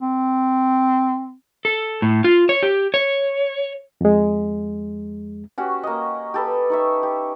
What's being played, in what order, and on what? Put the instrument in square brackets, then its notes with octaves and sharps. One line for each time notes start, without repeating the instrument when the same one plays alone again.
[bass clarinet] C4
[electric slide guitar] A4
A2
F4
C#5
G4
C#5
[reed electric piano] F2 G#3
[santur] C#4 F#4 G4
A#3 D#5
G4 A4 B4
D#4 C#5 E5
G4